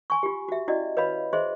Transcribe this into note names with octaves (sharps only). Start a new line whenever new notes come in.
G#5 C6 C#6
F4 G4
F#4 E5
C#4 E4 F#4 D5 D#5
B4 C#5 D#5 F5 B5
G#4 C5 D#5 E5 C6